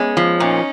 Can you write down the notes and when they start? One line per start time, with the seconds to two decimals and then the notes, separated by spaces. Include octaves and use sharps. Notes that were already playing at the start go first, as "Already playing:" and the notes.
Already playing: G#3 B3 C#4
0.17 F3
0.39 A#2 C#4 D#4